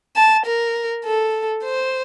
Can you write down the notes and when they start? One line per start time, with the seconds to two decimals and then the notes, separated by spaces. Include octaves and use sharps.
0.16 A5
0.46 A#4
1.05 A4
1.64 C5